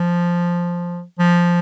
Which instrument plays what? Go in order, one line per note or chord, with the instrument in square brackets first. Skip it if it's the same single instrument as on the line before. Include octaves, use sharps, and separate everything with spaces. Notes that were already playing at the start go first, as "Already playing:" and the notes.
Already playing: [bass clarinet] F3
F3